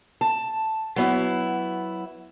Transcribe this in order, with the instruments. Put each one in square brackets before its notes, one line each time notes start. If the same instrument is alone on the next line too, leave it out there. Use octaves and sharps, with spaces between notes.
[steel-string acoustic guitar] A5
F#3 B3 E4